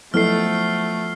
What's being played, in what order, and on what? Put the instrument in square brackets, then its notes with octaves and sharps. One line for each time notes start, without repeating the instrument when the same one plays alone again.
[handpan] F3 B3 [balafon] F#3 E4 A4 [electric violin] A3 [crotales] F6 C7